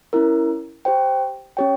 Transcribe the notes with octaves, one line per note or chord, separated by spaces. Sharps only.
C#4 E4 A#4
G4 C5 G5
C#4 G4 C#5 G5